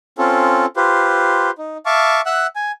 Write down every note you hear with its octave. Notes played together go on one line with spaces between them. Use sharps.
C4 C#4 F4 A4
F4 G4 B4 C5
D#4
E5 F5 A5 C#6 D6
E5 F#5 E6 F#6
G#5